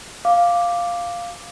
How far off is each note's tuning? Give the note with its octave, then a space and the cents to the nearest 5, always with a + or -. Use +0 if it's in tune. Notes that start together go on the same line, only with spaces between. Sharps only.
F5 +0 D6 +0